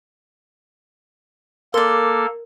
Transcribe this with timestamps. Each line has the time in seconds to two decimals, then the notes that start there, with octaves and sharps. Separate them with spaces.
1.74 A#3 A4 A#4 D5 C6